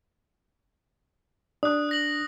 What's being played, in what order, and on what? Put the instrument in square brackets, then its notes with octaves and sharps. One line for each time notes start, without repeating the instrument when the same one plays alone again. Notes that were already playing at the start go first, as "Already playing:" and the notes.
[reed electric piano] D4 [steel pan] D5 D6 [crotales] D#6 F#6
[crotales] F#6 A#6 F#7